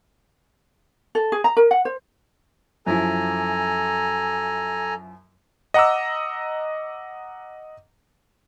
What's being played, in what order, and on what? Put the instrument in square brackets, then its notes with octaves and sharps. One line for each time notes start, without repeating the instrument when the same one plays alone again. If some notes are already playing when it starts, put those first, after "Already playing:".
[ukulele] A4
G#4
A#5
A#4
F#5
C5
[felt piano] F#2 F3 E4 [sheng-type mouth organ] A4 G#5 A#5
[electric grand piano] D#5 F#5 A#5 D6 E6